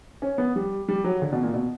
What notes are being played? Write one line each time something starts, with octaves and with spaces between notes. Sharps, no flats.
C#4
B3
G3
G3
F#3
D3
B2
A#2
B2